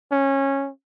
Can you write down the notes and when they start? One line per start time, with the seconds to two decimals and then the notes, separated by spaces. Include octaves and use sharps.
0.12 C#4